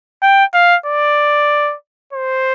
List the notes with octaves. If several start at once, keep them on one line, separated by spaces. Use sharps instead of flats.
G5
F5
D5
C5